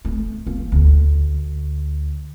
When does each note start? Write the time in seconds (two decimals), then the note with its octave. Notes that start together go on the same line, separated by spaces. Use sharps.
0.05 A3
0.47 A#3
0.72 D2